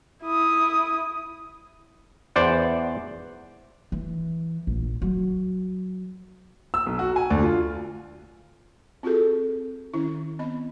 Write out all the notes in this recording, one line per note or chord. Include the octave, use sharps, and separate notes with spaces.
E4 D#6
E2 C5 D5 F#5
E3
A#1
F#3
E6
B1
F#4
G#5
D2
F4
C4 F4 F#4 G#4 A4
D#3 C#4 E4
B3 C4 D#5 B5